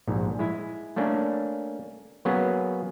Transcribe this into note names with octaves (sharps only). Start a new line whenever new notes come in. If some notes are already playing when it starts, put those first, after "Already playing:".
A#1 G#2
G#3 E4
A3 A#3 C#4 D4
F#3 A#3 B3 C#4 G#4